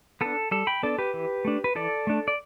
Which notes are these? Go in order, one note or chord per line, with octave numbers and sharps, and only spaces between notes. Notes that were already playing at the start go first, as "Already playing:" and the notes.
B3 D4 A4
G3 A4
G5 B5
B3 D4 A4 D5
G4 B4
E3
A3 D4
B4
E3 A4 D5
A3 D4
D5